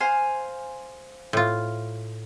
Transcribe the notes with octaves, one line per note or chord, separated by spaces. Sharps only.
C5 F5 G#5
A2 F4